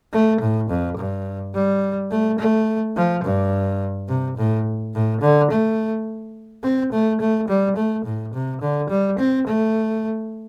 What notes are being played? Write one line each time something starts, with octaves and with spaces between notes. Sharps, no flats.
A3
A2
F2
G2
G3
A3
A3
F3
G2
C3
A2
A2
D3
A3
C4
A3
A3
G3
A3
A2
C3
D3
G3
C4
A3